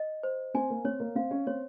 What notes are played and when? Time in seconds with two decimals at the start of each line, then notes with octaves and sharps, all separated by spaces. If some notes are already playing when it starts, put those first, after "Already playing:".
Already playing: D#5
0.23 C5
0.54 C4 G#5
0.70 A#3
0.84 C4 C#5
1.00 A#3
1.15 C4 F5
1.31 C#4
1.47 C4 C#5